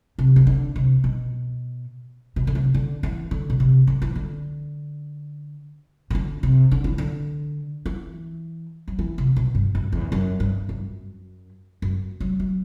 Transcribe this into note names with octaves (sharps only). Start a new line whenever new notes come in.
C3
E3
D3
C3
B2
B2
D3
C3
D3
E3
D3
B2
C3
D3
E3
D3
C3
D3
C3
D3
E3
D3
E3
F#3
E3
C3
B2
G2
F#2
E2
F#2
G2
F#2
F#2
F#3
F#3